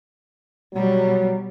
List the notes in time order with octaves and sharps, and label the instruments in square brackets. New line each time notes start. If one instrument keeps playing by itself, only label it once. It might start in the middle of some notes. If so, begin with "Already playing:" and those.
[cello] B2 G3 [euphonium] F#3